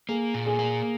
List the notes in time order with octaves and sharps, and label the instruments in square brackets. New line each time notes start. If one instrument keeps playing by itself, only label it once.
[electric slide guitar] A#3 [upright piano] G#4
[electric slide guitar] A#2
[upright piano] G#4
[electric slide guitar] A#3